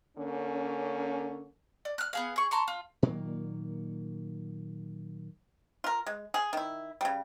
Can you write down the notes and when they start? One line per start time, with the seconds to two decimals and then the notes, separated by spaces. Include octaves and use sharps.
0.16 D3 A#3 C#4
1.85 D5
1.98 F6 F#6
2.13 B3 G#4 F5
2.36 G#4 C#6
2.51 A5 A#5 C6 C#6
2.68 F4
3.02 A#2 D#3 F#3 A#3
5.84 F4 A#4
6.06 G#3
6.34 G#4
6.53 D#3 E4
7.01 C#3 G3